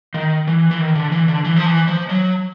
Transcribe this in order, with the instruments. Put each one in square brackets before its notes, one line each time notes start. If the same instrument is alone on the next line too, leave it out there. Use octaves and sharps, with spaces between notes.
[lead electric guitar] D#3
E3
E3
D#3
D3
E3
D3
E3
F3
E3
F3
F#3